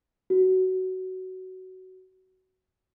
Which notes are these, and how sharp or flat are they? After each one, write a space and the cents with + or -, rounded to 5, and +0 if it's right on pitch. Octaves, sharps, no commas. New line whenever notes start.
F#4 +15